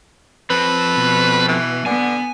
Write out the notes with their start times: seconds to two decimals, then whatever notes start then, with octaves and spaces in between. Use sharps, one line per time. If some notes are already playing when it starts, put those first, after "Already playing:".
0.50 F3 C4 B4
0.95 B2
1.48 E3
1.86 D3 B3 G#5